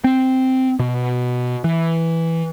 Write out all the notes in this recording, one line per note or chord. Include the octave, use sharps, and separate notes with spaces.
C4
B2
E3